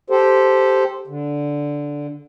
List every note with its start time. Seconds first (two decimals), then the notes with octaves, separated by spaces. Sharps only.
0.10 G4 A4 C5
1.07 D3